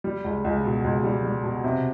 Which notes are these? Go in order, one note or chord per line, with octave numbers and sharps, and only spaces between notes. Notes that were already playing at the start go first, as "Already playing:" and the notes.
G3
C#2
C#2
B2
C#2
G3
G3
B2
C3